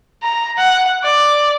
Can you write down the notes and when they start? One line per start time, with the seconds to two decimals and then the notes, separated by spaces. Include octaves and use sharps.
0.23 A#5
0.58 F#5
1.03 D5